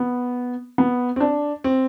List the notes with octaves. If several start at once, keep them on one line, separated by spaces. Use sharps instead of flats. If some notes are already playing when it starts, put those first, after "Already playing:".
Already playing: B3
B3
C4
D4
C4